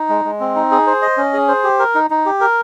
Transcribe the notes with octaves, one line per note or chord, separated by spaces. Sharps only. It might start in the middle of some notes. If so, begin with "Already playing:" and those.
Already playing: D#4
G#3
G#3
C4
D#4
G#4
C5
D#5
C#4
G#4
C5
G4
A#4
D#4
D#4
G4
A#4